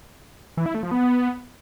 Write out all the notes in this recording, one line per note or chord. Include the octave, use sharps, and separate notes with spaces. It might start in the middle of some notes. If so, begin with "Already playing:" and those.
E3
E4
A3
F3
B3